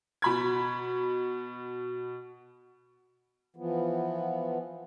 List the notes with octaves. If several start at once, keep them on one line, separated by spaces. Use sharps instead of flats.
B2 B5 G#6
E3 F3 B3